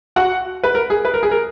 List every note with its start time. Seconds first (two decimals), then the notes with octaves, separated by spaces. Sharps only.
0.16 F#4 F#5
0.63 B4
0.75 A#4
0.90 G#4
1.05 B4
1.14 A#4
1.23 G#4
1.31 A#4